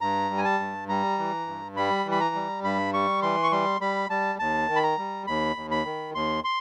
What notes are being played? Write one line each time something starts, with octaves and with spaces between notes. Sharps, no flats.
G2 A#5
G3
G#5
A5
G2
G3 A#5
E3
G2
G3 B5
E3
B5
A#5
G3
G2 B5
G3 C#6
E3 C6
C#6
G3 C6
G3 B5
G3 A5
D#2 A5
D#3
B5
A#5
G3
D#2 B5
D#2
B5
D#3
D#2 C6
C6